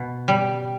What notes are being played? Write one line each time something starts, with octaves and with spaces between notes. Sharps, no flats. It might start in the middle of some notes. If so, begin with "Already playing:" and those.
Already playing: B2
G3